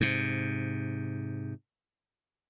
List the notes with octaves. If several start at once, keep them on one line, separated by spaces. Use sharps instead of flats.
G#2 C3